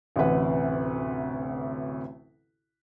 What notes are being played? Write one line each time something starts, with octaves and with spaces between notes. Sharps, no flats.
A1 D2 C3 B4 F#5